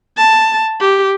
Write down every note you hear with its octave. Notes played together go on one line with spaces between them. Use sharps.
A5
G4